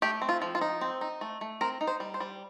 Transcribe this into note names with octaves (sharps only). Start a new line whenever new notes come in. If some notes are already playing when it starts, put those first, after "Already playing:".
A3 G4
C4
F4
F3
F4
D#4
C4
D#4
A3
A3
C4 A#4
D#4
C5
G3
C5
G3